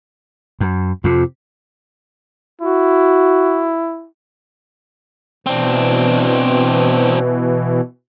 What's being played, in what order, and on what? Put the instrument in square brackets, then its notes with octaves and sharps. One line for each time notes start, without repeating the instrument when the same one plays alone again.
[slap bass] F#2
[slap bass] F2 C3 [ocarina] F4
[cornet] E4 [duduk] F#4
[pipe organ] B2 E3 [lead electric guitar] C4 D4